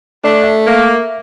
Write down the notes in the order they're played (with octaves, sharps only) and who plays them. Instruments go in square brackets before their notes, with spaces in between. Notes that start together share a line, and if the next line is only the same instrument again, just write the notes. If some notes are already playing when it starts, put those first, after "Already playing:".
[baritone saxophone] A3 [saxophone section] D4 [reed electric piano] D5
[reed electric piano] E5
[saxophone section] A#3